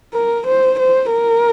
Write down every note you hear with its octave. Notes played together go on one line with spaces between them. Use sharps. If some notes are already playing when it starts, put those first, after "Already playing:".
A#4
C5
C5
A#4